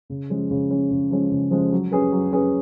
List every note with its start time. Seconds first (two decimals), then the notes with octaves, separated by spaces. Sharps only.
0.10 C#3
0.30 F3 G#3 C#4
0.51 C#3
0.71 F3 G#3 C#4
0.91 C#3
1.11 F3 G#3 C#4
1.31 C#3
1.51 F3 G#3 C#4
1.73 F#3
1.92 C#4 G#4 B4
2.12 F#3
2.33 C#4 G#4 B4